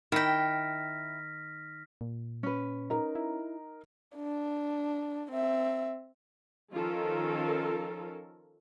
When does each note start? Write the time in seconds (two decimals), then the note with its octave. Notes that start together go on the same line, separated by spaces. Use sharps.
0.12 D#3 E4 G5 F6 A#6 B6
2.01 A#2
2.43 C#4 B4
2.90 D#4 A#4
3.15 E4
4.16 D4
5.32 C4 E5
6.74 D#3 F3 C#4 F4 A4 A#4